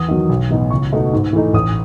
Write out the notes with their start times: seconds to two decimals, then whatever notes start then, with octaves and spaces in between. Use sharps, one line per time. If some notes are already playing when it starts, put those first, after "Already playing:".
Already playing: E2 D#6
0.08 D#3 F#3
0.29 B1
0.50 A2 E3 B3 D#4
0.70 C#2 C#6
0.92 B2 A3 D#4
1.13 G#2
1.33 E3 A3 D#4
1.54 A1 D#6